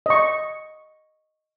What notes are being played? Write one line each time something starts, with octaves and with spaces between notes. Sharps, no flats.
D#5 C#6